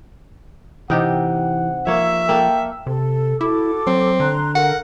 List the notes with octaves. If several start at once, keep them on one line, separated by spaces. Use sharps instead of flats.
C3 E3 D#4 G4 F#5
F3 A#3 C#5 E5
A#3 A4 G5
C3 A4
E4 F#4 A4 D6
F#3 C4
D3 A#5 C6 F#6
A4 A#4 F5 F#5